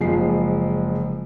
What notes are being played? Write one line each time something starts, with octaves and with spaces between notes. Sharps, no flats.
F#1 F3 G#3 C7